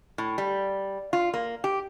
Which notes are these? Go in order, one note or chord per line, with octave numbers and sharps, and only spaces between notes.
A2
G3
F4
A#3
G4